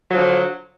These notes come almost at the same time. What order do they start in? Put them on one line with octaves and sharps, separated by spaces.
F#3 F3 D3